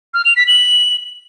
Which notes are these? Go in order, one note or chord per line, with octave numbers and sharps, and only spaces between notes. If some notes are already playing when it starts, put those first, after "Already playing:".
F6
F7
B6
F#7